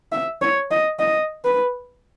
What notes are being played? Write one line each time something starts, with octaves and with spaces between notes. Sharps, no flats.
E5
C#5
D#5
D#5
B4